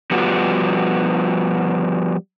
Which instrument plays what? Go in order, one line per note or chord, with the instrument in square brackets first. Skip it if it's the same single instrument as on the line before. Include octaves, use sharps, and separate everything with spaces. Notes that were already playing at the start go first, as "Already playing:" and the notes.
[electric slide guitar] F3 G3 B3 F#4